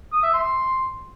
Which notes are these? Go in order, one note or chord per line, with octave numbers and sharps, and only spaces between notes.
D#6
E5
C6